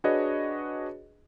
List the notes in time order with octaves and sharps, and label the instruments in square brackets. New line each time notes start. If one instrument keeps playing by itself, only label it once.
[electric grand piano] D4 F#4 G#4 B4 C#5 D#5